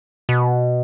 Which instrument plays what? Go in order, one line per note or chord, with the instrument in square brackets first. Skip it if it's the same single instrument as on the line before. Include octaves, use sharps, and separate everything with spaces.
[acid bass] B2